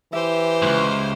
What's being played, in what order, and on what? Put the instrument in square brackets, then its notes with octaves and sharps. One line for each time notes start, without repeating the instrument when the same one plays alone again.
[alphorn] E3 [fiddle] G4 C5 [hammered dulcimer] E5
[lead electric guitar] C#2 G#2